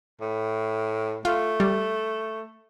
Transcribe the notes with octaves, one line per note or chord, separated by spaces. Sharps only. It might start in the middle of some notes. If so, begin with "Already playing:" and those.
A2
A3 F4
G3